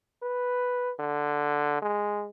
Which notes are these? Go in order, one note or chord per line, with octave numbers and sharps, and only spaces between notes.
B4
D3
G#3